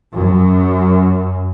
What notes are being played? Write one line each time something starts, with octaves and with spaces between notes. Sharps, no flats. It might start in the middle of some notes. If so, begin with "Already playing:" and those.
F#2